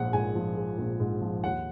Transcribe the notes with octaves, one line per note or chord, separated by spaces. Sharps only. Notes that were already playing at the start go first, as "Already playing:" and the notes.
Already playing: A#1 G#2 F3 G#3 F#5
G#2 G#5
F3
G#3
A#1
G#2
F3
D#2 F#5